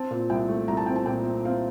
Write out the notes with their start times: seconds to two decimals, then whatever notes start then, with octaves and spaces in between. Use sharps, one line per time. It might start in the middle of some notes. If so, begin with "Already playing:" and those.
Already playing: C4 A5
0.11 A#2
0.30 C2 G5
0.48 A3
0.68 C2 A#5
0.77 A5
0.86 C4 G5
0.96 A5
1.06 A#2 G5
1.25 C4
1.45 C4 F5